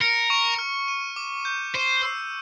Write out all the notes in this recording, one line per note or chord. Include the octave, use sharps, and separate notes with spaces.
A#4 C#7
C#6
F6
D#7
D6
G6
C5 D#7
E6